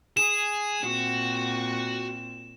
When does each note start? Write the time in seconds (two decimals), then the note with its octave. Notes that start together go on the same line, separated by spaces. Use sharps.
0.17 G#4 E7
0.84 A#2 C4 F#4